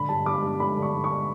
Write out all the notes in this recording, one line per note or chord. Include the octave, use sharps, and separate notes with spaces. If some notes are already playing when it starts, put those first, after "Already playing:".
Already playing: D3 B5
G2 A5
G2 D6
G2
A3 B5
D3
C#6
G2
C#6